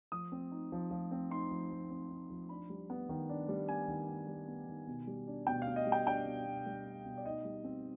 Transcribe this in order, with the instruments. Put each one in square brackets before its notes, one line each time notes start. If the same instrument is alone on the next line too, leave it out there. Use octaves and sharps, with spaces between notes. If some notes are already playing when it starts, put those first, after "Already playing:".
[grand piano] F3 D#6
C4
D#4
F3
F3
C4
D#4 C6
F3
F3
C4
D#4
F3
D4 B5
G3
B3
D#3
D4
G3
B3 G#5
D#3
D4
G3
B3
D#3
B2
G3
D4
B2 G5
B2 F5
D#5
G3
G5
D4 G5
B2
B2
G3
D4
B2
D5
D#4 D#5
G3
C4